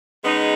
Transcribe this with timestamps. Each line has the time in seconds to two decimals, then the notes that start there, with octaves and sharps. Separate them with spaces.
0.23 C#3 G#3 B3 D#4